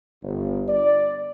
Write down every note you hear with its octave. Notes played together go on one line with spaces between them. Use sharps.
G1
D5